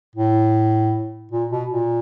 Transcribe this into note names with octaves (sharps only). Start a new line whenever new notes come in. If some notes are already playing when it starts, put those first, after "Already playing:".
A2
A#2
B2
A#2